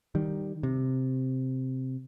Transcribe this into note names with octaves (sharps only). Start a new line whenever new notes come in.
D#3 G3
C3